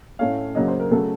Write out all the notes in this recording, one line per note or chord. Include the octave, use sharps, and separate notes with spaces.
A2 A3 C#4 F5
C#3 F#3 A#3 C#4 D#5
C5
A#4
C#3 F#3 A3 A4